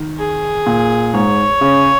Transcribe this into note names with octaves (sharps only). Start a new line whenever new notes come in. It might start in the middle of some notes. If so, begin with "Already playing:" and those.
Already playing: D#3
G#4
A#2
G#2 C#5
C#3